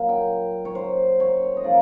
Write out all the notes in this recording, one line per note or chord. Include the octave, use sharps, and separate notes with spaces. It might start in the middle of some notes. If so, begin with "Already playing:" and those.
Already playing: A#2 F#3 A#3
G5
C#5
C5
C#5
D#5
C#3 F3 A#3 D5